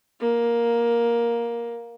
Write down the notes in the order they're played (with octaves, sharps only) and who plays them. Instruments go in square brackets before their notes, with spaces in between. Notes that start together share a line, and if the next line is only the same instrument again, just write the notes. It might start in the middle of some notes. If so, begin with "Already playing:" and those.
[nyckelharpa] A#3